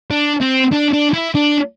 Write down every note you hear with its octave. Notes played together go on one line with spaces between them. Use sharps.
D4
C4
D4
D4
E4
D4